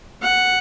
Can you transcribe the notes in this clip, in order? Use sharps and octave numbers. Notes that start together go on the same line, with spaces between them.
F#5